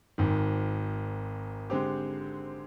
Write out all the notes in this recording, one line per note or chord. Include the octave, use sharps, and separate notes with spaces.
G#1 G#2 D#3
D3 G#3 C4 G4